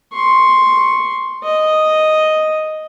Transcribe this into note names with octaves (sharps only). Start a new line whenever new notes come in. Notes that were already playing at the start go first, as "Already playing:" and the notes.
C6 C#6
D#5